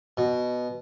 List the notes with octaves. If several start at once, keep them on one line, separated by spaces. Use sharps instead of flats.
B2